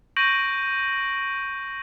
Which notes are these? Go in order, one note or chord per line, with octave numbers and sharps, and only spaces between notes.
C#6 G6 A#6 D7 D#7 F#7